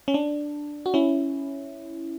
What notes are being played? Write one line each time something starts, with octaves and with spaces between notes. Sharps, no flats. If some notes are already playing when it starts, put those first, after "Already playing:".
C#4
D4
F#4
C#4 E4